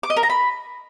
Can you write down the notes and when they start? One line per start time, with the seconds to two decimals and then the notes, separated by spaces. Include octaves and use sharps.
0.03 D6
0.10 D#5
0.16 A#4
0.23 A#5
0.30 B5